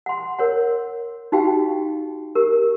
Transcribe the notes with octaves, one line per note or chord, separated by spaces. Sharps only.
F#5 C6
A#4 C#5 F#5
D#4 F#4 G4 F5 G5
G4 A#4